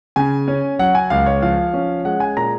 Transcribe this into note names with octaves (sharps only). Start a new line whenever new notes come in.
C#3 G#5
C#4
F#3 F#5
G#5
C#2 F5
C#5
F3 F5
C#4
G#3 F#5
G#5
A#2 A#5